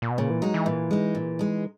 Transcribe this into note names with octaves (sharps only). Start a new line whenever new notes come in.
A#2
B2
A#2 C#3
E3
F#3 G#3 D#4
E3
A#2
G#3 D#4
A#2
G#3 D#4